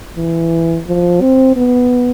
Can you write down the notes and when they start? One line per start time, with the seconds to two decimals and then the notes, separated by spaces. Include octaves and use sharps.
0.17 E3
0.87 F3
1.21 C4
1.56 B3